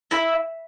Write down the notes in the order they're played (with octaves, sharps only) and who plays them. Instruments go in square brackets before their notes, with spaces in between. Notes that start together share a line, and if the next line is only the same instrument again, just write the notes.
[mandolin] E4